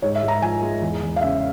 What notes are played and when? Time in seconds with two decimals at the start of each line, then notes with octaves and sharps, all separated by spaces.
0.02 G#2 C#5
0.15 E5
0.23 G#2
0.28 A#5
0.42 F3 G#5
0.62 G#3
0.82 E2
1.02 E2
1.16 F5
1.21 C#3 E5